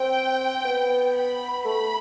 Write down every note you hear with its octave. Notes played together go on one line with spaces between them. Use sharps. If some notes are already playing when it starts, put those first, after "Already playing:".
Already playing: C4 G5
B3
B5
A3 B5